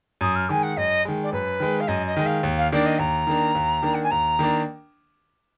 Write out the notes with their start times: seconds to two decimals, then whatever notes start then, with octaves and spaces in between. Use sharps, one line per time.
0.21 F#2 D#6
0.35 F6
0.49 D#3 G#3 G#5
0.63 F#5
0.77 F#2 D#5
1.05 D#3 G#3
1.23 D5
1.33 F#2 B4
1.60 D#3 G#3
1.80 F5
1.88 F#2 D#5
2.07 D#5
2.17 D#3 G#3
2.26 F5
2.43 D#2
2.58 F5
2.72 D#3 A#3 D4 D5
2.86 D#5
2.99 D#2 A#5
3.27 D#3 A#3 D4
3.55 D#2
3.83 D#3 A#3 D4
3.94 F#5
4.03 G#5
4.11 D#2 A#5
4.39 D#3 A#3 D4